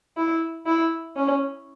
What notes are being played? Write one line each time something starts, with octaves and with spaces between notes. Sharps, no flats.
E4
E4
C#4